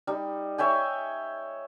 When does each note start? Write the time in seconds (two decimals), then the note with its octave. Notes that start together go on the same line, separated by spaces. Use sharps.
0.07 G3 D#4
0.58 C#5 E5 G5 G#5